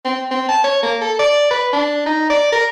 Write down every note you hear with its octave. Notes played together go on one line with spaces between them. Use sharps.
C4
C4
A5
C#5
A#3
A4
D5
B4
D4
D#4
D5
A#4